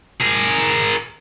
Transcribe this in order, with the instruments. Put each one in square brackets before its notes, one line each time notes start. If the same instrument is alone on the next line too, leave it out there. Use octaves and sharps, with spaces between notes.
[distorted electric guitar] G#4 A#4